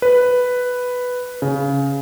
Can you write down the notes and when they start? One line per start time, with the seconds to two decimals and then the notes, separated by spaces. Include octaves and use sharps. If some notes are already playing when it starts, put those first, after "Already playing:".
0.02 B4
1.42 C#3